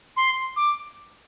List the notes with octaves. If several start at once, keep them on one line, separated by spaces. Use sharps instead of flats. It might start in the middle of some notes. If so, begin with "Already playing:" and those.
C6
D6